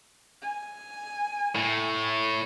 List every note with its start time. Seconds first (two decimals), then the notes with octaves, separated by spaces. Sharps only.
0.42 G#5
1.55 A2